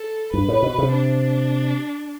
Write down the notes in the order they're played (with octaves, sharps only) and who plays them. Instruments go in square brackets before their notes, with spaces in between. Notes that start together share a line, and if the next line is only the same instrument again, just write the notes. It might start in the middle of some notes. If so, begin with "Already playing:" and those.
Already playing: [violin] A4
[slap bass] G2 [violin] B4
[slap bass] A2
B2
C3
[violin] D4